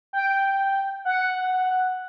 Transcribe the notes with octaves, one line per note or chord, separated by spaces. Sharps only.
G5
F#5